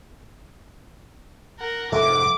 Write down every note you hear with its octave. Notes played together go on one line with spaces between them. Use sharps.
A#4 F#5
F1 G#2 G#3 A4 E5 F#5 D6